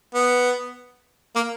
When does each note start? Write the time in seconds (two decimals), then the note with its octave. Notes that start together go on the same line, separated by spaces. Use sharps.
0.15 B3
1.36 A#3